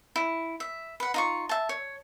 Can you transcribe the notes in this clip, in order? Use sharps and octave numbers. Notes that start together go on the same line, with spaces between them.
E4
E5
B4 F#5
D#4 F4 C#6
E5 A5
C#5